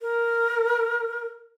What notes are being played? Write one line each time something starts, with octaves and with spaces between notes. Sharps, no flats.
A#4